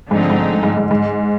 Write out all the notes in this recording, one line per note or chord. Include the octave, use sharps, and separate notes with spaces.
G#2 D3 F3 A3 C4 D#4
G#2
G#2
G#2
G#2